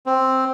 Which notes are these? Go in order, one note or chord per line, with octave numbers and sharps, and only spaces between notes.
C4